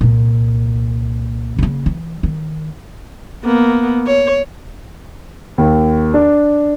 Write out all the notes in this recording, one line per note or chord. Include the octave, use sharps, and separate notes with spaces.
C2 A#2
C#3 A#3
E3
D#3
A#3 B3
C#5
D#2
D4